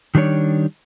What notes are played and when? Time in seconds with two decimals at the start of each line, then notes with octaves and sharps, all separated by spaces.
0.15 D#3 G3 D4 G4 C#5